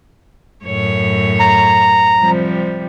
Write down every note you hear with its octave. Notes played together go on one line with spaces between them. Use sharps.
F#2 A2 C#5
A#5
C3 F3 G3